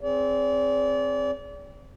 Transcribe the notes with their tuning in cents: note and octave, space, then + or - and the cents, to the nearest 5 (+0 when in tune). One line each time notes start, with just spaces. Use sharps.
C4 +0 G#4 +0 D5 -35